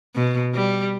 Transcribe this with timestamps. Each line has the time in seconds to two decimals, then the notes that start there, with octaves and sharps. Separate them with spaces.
0.15 B2
0.54 G3